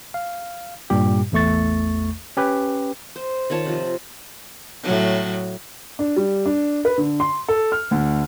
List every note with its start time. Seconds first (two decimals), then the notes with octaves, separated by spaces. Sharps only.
0.14 F5
0.90 G2 A#2 G3 G4
1.32 A1 E2 A3 C#6 A6
2.37 C#4 G4 B4
3.16 C5
3.50 D#3 F4 C#5 A5
3.65 C3 F3
4.83 A2 F#3
5.99 D4
6.16 G3
6.46 D4
6.85 B4
6.98 D3
7.20 C6
7.48 A4
7.72 F6
7.91 D2